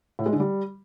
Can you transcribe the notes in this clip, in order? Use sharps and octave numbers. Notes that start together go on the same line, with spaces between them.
A2
G#3
D3
G3